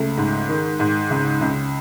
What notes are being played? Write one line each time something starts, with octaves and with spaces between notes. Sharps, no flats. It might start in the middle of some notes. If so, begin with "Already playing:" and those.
Already playing: C#2 A3
G#2
D#3
G#2
C#2
C#2